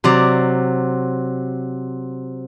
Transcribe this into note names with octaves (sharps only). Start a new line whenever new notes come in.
C3 F#3 D5